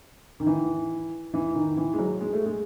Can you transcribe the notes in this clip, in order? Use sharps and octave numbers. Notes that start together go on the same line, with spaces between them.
D#3
E3
E3
D#3
E3
G#3
F#3
G#3
A3
G#3